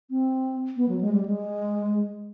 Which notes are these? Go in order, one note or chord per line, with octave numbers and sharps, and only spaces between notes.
C4
B3
F#3
G#3
G3
G#3